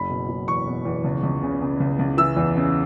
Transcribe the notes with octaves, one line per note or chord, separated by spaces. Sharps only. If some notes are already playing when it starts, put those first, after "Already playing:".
Already playing: F#1 B5
B2
F#1
E2 C#6
B2
E2
C#2
C#2
C#3
C#3
C#2
C#2
E3 E6
E2
C#3